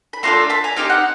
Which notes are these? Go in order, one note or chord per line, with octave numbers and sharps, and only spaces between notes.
B5
A3 D4 F4 A4 A#5 C6
A5 B5
G#5 A#5
C4 D#4 G4 F5
F#5